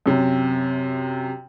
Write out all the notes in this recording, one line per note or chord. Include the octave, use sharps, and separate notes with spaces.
F#2 C3